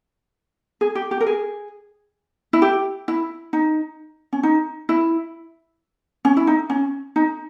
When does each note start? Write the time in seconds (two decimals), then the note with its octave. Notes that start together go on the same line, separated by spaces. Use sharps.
0.81 G#4
0.95 G4
1.11 G4
1.21 A#4
1.27 G#4
2.53 E4
2.62 G4
3.08 E4
3.53 D#4
4.33 C#4
4.43 D#4
4.89 E4
6.25 C#4
6.37 E4
6.47 D#4
6.70 C#4
7.16 D#4